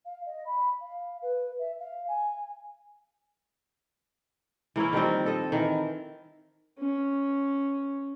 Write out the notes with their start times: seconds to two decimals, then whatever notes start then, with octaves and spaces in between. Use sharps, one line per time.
0.06 F5
0.26 D#5
0.46 B5
0.81 F5
1.22 B4
1.59 E5
1.80 F5
2.08 G#5
4.76 E3 A#3 C#4 E4
4.93 D#3 F3 G3 C4
5.26 A4 D#5
5.52 D#3 E3
6.79 C#4